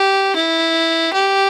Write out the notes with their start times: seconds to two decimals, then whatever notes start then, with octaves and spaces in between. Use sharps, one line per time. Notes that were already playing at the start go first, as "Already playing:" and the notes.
Already playing: G4
0.36 E4
1.14 G4